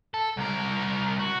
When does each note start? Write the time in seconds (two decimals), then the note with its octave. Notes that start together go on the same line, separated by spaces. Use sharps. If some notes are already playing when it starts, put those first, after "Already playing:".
0.14 A4
0.38 C2 A#4
1.20 F#4